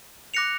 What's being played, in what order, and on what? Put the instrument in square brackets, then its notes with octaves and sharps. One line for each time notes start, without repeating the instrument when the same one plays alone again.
[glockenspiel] D6 F#6 A#6 C#7 F7